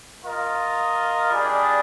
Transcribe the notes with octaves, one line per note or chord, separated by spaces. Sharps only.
F4 A#4 D#5
G3 D4 G#4